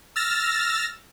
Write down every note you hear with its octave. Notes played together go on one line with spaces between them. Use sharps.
E6 F6 A6 A#6